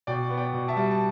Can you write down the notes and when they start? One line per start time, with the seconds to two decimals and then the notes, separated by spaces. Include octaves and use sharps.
0.07 B2 D5 G5
0.30 B3
0.38 D5 G5
0.53 B2
0.68 E5 A5
0.77 G3
0.91 A5